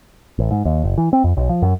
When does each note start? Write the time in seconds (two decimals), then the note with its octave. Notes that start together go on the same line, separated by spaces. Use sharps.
0.39 A1
0.51 G#2
0.65 D#2
0.84 F#1
0.98 E3
1.13 C4
1.24 F2
1.37 B1
1.49 F3
1.62 F#2